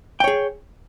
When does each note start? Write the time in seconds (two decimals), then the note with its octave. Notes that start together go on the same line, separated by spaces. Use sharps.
0.20 G5
0.24 C#5
0.27 G#4